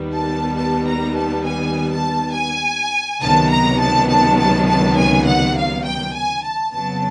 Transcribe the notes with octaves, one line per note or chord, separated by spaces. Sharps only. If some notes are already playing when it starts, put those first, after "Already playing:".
Already playing: D#2 D#3 G3 B3
A5
A5
A#5
A5
G#5
A5
G#5
C#2 C3 D#3 F#3 B3 A5
A#5
A5
A5
A5
A5
G#5
F#5
F5
G5
G#5
A5
F2 C#3 F#3 B3 A5